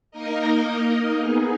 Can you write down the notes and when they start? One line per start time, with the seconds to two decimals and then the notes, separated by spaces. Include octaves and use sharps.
0.11 A#3 D#4 A#4 D#5
1.19 B3 D#4 G#4